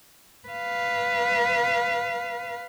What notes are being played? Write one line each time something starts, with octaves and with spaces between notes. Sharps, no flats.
B4 F5